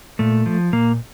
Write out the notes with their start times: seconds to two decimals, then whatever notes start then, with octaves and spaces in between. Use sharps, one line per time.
0.19 A#2 A3
0.46 F3
0.73 A#2 A#3